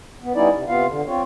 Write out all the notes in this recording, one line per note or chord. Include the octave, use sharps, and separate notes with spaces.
B3
G3 B3 C#4 D#4 E4 D5
C3
C3 B3 F4 F5
D3
C4 F4 C#5